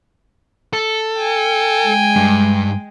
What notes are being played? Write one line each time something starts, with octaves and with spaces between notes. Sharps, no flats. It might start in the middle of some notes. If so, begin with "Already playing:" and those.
A4
G5 G#5
G#3
G2